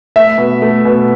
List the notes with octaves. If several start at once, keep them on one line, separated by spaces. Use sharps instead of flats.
A3 E5
B2
A3
B2